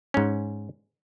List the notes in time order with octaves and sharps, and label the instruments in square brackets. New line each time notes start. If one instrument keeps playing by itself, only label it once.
[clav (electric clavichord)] G#2 C#4